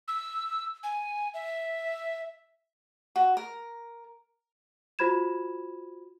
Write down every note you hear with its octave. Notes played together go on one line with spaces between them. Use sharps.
E6
G#5
E5
F#4
A#4
F4 F#4 C5 B5 G#6 E7